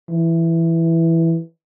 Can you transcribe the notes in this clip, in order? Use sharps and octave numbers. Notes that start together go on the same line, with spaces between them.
E3